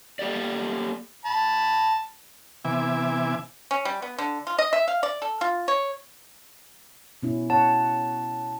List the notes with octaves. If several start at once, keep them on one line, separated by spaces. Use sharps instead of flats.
A#3 G4 A4 D5
A5 B5
C3 E3 B3 E5 G#5 D6
C#4
G3
B3
D3
F4
D#5
E5
F5
D5
A4
F4
C#5
B2 C#4 E4
C#4 C#5 F#5 A5